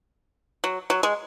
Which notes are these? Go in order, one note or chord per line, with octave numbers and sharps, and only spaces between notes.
F#3
F#3
G#3